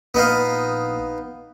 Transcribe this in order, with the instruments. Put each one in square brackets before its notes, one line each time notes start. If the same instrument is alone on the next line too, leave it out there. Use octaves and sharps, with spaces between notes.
[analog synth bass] A#1 [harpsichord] B3 D#4 F5